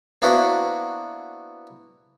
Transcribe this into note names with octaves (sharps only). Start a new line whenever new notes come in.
A#3 B3 D4 E4 F#4 C5